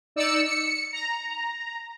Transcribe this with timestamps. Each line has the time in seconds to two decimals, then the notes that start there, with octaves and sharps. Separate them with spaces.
0.16 D#4 D5 E6 C#7
0.45 C#7
0.93 A#5